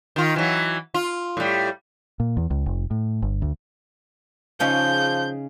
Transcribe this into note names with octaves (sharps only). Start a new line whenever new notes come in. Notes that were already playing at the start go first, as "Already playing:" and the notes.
D#3 F4
E3 F#3
F4
A2 G3
A#2
E2
C#2
F1
A2
G1
D2
C#3 F3 C#4 D#4 G6